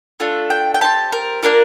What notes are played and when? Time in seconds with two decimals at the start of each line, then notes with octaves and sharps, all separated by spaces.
0.20 A3 D4 F4 A4
0.50 G5
0.74 G5
0.81 C4 E4 G4 A5
1.12 A#4
1.43 A#3 D4 F4 A#4